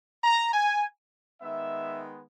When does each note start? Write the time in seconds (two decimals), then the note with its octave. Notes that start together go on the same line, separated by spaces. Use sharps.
0.24 A#5
0.53 G#5
1.41 D#3 G#3 B3 E5